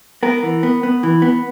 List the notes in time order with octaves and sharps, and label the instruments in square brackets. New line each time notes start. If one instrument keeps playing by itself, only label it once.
[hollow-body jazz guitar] B3 A#4
E3
B3
B3
E3
B3